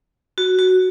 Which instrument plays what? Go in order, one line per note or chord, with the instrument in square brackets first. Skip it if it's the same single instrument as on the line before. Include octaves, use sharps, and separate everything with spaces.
[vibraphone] F#4
F#4